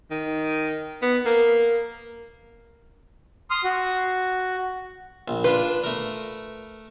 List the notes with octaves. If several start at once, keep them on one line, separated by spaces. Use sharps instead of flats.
D#3
B3
A#3
C6 D#6 F6
F#4
A#1
D4 F4 B4 C6
A3 A#4